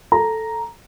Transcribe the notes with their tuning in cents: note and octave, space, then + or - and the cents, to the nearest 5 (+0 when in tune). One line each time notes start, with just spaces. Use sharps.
A4 +0 A#5 +0